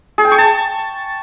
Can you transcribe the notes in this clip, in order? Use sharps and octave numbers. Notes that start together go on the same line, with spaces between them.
G#4
G5
C#6
A5